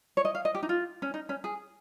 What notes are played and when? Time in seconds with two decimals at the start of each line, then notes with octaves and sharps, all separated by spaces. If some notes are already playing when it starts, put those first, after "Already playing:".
0.17 C#5
0.25 D#5
0.35 F5
0.45 D#5
0.55 G4
0.63 D#4
0.69 F4
1.02 C#4
1.14 D#4
1.29 C#4
1.44 G#4